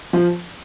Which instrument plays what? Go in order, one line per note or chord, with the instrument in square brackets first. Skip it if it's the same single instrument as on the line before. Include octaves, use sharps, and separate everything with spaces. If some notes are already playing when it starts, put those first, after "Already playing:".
[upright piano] F3